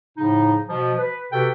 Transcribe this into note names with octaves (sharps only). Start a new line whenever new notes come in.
A2 C#3 F3 D#4
B2 F3
B4
C3 F#4 A4 B4 G5